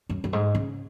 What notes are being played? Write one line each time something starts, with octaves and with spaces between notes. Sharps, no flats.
F#2
F#2
G#2
C#3